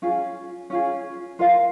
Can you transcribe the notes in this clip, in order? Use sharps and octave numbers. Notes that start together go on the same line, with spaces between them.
C#4 F4 G#4
C#4 F4 G#4
F4 A#4 F5